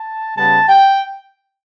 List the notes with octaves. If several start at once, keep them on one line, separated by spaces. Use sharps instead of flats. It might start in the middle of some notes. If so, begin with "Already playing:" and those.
Already playing: A5
C#3 G3 B3 A5
G5